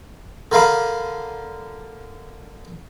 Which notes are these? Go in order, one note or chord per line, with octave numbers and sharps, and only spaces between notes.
D3 A#4 F5 B5